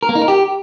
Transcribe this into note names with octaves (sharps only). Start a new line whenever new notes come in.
A#4
A#3
D#4
A#4
G4